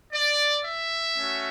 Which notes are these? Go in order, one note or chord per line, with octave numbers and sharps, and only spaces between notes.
D5
E5
A3 C#4 F#4